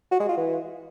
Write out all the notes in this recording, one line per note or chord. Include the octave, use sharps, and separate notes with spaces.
F#4
G#3
F4
E3